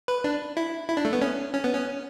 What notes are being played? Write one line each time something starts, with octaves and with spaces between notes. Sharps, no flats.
B4
D4
E4
E4
D4
A3
B3
C#4
C#4
B3
C#4